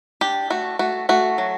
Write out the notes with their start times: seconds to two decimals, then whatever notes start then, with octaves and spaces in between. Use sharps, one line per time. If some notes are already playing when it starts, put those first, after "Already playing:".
0.21 D4 G4
0.50 A3 F#4
0.79 A3 F#4
1.09 A3 F#4
1.38 F#3